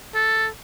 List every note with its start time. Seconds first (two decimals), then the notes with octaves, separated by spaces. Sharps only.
0.15 A4